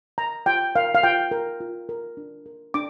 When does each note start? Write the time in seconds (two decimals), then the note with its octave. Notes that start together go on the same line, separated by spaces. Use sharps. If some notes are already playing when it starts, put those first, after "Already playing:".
0.18 A#4 A#5
0.46 F4 G5
0.76 A#4 F5
0.95 F5
1.03 F4 G5
1.31 A#4
1.61 F4
1.89 A#4
2.17 D4
2.46 A#4
2.74 D4 D6